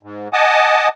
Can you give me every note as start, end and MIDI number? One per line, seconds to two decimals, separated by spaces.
0.03 0.28 44
0.33 0.88 75
0.33 0.88 78
0.33 0.88 80
0.33 0.88 81
0.33 0.88 86
0.33 0.88 87